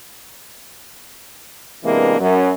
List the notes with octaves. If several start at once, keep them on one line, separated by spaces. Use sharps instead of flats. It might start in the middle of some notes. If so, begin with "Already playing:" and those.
C3 E3 G#3 A#3 B3 D4
F#2